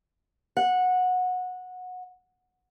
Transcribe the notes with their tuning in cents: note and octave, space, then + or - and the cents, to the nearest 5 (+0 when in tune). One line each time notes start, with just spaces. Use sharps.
F#5 -20